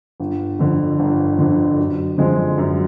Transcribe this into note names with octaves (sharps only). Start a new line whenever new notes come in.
G1
F2 D3
G1
F2 D3
F#2
D3 F3 G#3 C4
F#2